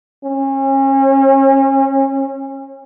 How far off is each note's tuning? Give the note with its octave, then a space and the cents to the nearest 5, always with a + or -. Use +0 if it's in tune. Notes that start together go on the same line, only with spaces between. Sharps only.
C#4 -35